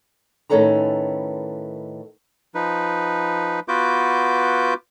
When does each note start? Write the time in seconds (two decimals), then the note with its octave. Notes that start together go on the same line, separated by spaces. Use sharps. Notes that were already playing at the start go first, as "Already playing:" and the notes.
0.50 A2 D#3 C#4 A4 B4 A#5
2.55 F3 D#4 B4
3.68 B3 F4 F#4 B4 D6 G6